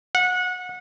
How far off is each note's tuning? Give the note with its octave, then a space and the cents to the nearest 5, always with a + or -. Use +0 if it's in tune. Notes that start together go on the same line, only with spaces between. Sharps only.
F#5 -25